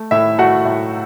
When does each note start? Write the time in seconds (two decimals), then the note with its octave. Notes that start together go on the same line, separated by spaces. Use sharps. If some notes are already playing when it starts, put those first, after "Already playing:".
Already playing: A3
0.11 A2 E4 E5
0.39 A3 F#4 F#5
0.65 A2